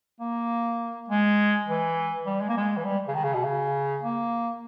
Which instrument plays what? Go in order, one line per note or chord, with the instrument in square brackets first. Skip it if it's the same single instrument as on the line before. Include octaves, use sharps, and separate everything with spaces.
[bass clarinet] A#3
G#3
E3
G3
G#3
A#3
G#3
E3
G3
C#3
D#3
C#3
B2
C#3
A#3